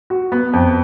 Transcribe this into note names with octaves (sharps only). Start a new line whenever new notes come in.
F#4
B3
F2